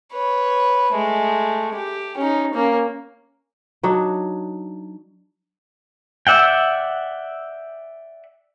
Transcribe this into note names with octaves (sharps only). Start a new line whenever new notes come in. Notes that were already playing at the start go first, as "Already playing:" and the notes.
B4 C#5
G#3 A3
G4
C#4 D#4
A#3 C#4
F#3 D4 D#4 F#4
D5 E5 F#5 G5